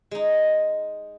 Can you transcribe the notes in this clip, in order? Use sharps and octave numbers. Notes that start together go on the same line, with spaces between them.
G#3 D#4